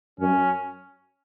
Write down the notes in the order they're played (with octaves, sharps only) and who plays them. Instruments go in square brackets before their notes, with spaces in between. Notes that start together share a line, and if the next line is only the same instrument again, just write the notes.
[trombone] F#2 [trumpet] C#4